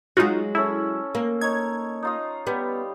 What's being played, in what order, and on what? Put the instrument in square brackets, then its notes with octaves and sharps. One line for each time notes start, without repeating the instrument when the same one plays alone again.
[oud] F#3 G#3 [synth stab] D#4 F4 F#4
[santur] C#4 A4 E6 [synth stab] E4
[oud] A#3
[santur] D#4 C#5 [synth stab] G#6
[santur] D#4 F4 D#5
[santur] G3 [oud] B3